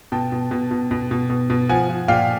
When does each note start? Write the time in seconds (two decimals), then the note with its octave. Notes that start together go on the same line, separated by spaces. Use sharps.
0.12 B2 G5 A5
0.32 B2
0.51 B2
0.71 B2
0.91 B2
1.11 B2
1.30 B2
1.50 B2
1.69 F3 F#5 G#5
1.89 F3
2.08 A#2 F5 G5